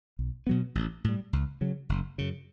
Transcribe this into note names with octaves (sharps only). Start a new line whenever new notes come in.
B1
B2 F#3 B3
A1
A2 G3
C#2
C#3 F#3
F#1
F#2 C#3